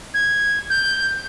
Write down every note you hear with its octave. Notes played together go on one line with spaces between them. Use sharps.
G#6
G6